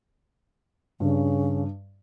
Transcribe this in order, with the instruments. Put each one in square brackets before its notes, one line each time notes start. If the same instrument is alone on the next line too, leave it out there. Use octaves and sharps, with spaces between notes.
[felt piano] G2 [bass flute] C#3